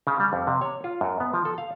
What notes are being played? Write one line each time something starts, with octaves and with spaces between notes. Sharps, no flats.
C#3
G3
F2
C3
C#5
F4
F#2
B3
F3
A4
F5